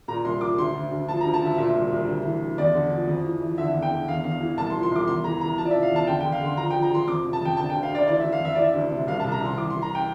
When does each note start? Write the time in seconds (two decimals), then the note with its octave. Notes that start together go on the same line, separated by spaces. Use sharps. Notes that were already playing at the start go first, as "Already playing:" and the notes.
0.08 A#2 A#5
0.24 C2 C6
0.41 F3 D6
0.58 D2 C6
0.74 D2
0.91 D2
1.08 F3 A5
1.21 A#5
1.25 D2
1.34 A5
1.41 D2 E5
1.57 A#2 E5
1.74 C2
1.92 C2
2.08 D2
2.25 E3
2.42 D2
2.58 E2 D5
2.74 D3
2.92 F3
3.08 F2
3.24 E3
3.41 E3
3.58 D3 E5
3.74 E2
3.82 G5
3.91 D3
4.08 E2 F5
4.24 E2 F5
4.41 E3
4.57 C2 A5
4.70 C6
4.75 F3
4.83 C6
4.91 C2 D6
5.08 E2 C6
5.24 E3 A#5
5.41 E3 A#5
5.58 F3 A5
5.65 D5
5.71 E5
5.74 C3
5.83 F5
5.91 E2 A5
6.07 D3 G5
6.21 G5
6.25 D3
6.32 F5
6.41 D3 C6
6.57 F3 A#5
6.71 G5
6.74 F3
6.82 A#5
6.91 F3 C6
7.07 F2 D6
7.24 C3
7.33 A5
7.41 F2 G5
7.57 D3 A5
7.70 G5
7.74 D2
7.83 F5
7.91 D2 D5
8.08 E3 D5
8.20 E5
8.24 E3
8.32 F5
8.41 F2 E5
8.55 E3 D5
8.64 E5
8.74 D2
8.91 C3
9.07 C2 F5
9.20 A5
9.24 C2
9.32 A#5
9.41 C2 C6
9.57 E3 D6
9.70 C6
9.75 E3
9.82 A#5
9.95 G5